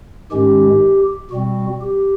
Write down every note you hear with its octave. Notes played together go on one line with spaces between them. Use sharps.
G#2 D#3 G#3 C#4 G4
B2 G3 C4 F#4
G4